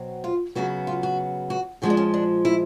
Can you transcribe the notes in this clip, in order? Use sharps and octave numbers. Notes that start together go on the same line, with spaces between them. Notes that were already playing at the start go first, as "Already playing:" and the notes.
Already playing: B2 F#3 C4
F4
C#3 F#3 B3 F#4
F4
F#4
F#4
A#2 F3 G#3 C#4 F#4
D4
C#4
D4
E4